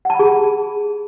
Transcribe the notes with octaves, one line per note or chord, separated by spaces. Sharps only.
G#4 F#5 A5 B5